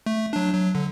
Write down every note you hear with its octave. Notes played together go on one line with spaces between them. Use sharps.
A3
F#3 D4
F#3
D3